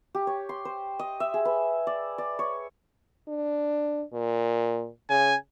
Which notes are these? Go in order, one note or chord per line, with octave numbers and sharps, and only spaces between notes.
G4
C#5
C6
C5
D#5
E5
G#4
B4
D5
D5
C#5
D4
A#2
C#3 G#5